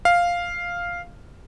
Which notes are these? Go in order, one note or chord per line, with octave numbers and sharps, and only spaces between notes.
F5